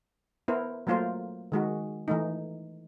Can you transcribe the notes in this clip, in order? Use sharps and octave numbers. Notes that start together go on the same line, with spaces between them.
B3 E4 A#4 C5
F#3 A3 A#3 F4 A#4 C5
D#3 G#3 F#4
E3 A3 D#4